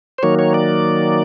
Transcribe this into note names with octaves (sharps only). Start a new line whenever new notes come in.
C5
D#3 F#3 A#3 C#5
C#5
D5